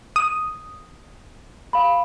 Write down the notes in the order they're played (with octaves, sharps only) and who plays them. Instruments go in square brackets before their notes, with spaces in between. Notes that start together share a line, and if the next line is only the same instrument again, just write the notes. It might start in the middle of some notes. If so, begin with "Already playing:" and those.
[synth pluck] D#6
[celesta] F5 B5